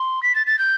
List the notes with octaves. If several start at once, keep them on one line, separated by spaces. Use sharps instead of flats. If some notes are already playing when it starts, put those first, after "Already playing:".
Already playing: C6
B6
A6
A6
G6